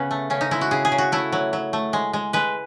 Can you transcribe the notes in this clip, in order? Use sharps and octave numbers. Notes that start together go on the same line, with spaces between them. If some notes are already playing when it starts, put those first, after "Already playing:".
Already playing: C#3 B3 C#4
A3
C#3 C#4
D#4
G#3 E4
F#4
C#3 G#4
G#4
C#3
F#4
A3 E4
F#3
F#3
A3
G#3
G#3
G#3 B4